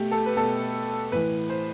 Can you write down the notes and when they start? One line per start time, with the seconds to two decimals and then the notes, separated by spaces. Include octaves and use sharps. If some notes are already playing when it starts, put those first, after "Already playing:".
Already playing: B2 A3 G4
0.11 A4
0.26 B4
0.37 B2 A4
1.12 A2 E3 B4
1.50 C5